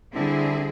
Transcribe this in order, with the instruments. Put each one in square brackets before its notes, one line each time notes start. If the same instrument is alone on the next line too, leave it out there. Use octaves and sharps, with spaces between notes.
[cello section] D3 G3 C4 E4 G#4